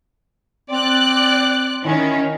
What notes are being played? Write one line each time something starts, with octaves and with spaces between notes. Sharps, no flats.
C4 D5 F#6
D#3 C#4 E4